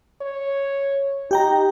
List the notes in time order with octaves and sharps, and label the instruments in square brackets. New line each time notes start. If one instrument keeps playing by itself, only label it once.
[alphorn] C#5
[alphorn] D#4 [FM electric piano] G4 G5 A#5